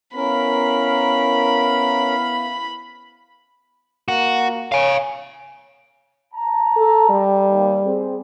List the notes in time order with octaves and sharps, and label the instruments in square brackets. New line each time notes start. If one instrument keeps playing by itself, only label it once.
[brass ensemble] B3 E4 F5 [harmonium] C#4 A#4 [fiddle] B5
[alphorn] A#3 [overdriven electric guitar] F#4
[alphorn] C#5 [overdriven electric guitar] F5 G#5
[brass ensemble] A5 A#5
[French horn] A4
G3
[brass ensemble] D#2
C4 G#4